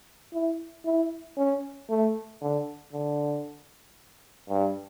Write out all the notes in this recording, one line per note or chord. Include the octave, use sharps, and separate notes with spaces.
E4
E4
C#4
A3
D3
D3
G2